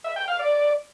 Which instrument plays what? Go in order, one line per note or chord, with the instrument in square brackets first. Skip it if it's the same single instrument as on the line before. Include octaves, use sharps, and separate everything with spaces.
[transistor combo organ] E5
G5
F5
D5